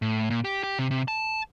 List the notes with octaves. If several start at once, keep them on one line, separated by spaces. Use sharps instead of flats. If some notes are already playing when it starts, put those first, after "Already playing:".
A2
A#2
G4
G4
C3
C3
A5